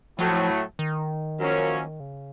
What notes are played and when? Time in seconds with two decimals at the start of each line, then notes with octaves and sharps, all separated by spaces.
0.19 A2 F3 F#3 A3
0.79 D#3
1.39 F#2 F3 A#3 C#4
2.00 C#3